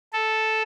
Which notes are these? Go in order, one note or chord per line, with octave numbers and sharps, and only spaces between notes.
A4